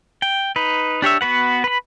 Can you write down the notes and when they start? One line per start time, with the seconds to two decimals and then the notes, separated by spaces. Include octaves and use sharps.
0.22 G5
0.56 D#4 B4
1.02 D4 G4 C#5 E5
1.21 B3 F#4 B4 F#5
1.64 B4 B5